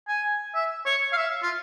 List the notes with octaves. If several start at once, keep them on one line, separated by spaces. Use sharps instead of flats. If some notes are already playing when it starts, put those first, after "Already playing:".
G#5
E5
C#5
F5
E5
F4